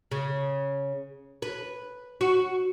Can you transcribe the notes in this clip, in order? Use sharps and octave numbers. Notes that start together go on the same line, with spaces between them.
C#3
B4
F#4